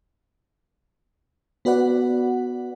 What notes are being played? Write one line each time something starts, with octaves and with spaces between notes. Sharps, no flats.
B3 F#4 B4 D5 F#5